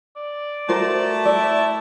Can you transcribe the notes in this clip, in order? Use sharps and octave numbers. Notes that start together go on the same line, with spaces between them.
D5
A3 F#4 A#4 C5
E4 D5